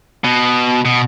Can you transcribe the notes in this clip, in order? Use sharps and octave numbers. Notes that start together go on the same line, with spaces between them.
B2
B2